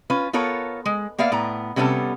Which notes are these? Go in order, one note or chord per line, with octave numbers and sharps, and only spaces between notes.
C#4 F4 B4
B3 F4 A4 A#4 C#5
G#3
A#3 B3 D5 E5 F5
A2 B3 A#5
C3 G3 B3 C#4 D4 A4